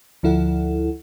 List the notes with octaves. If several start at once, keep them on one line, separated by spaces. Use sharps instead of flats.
D2 F3 E4 A4 F#5